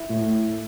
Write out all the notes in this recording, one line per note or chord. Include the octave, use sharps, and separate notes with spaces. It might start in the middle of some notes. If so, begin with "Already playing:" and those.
Already playing: E4
A2